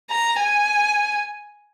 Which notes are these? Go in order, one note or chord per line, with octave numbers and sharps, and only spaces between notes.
A#5
G#5